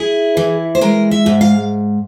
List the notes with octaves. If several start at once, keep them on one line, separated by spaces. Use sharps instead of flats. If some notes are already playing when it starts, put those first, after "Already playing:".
Already playing: E4 G#4
E3
C5
G#3 A#4
E5
G#2
F5